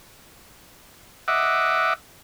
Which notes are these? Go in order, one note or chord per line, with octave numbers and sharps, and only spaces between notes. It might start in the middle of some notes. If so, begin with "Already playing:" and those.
D#5 E5 F#5 D6